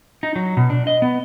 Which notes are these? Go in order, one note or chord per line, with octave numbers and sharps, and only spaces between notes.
D#4
F#3
B2
D4
D#5
B3